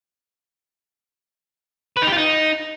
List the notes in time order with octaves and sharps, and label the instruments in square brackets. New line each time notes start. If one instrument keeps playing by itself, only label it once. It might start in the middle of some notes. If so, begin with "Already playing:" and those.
[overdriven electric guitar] B4
D#4
G4
F4
D#4